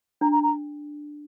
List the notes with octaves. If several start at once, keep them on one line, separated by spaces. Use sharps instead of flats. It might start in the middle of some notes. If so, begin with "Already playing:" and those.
D4 A#5
A#5
A#5